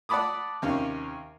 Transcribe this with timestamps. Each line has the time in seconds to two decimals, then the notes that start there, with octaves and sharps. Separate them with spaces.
0.09 D5 F#5 A5 B5 D6 D#6
0.62 D#2 C3 C#4 F5